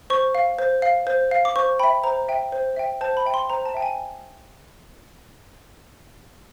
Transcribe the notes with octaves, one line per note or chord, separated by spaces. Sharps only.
C5 C#6
F5
C5
F5
C5
F5
D6
C5 C#6
E5 G5 B5
C5 A#5
E5 G5
C5
E5 G5
C5 A5
B5
E5 G5
C6
C5 A#5
A5
E5 G5
G#5